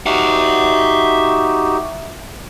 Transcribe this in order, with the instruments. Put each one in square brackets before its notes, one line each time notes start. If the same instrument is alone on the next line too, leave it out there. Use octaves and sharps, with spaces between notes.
[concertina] D#4 F#4 G4 [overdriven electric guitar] E5 F#5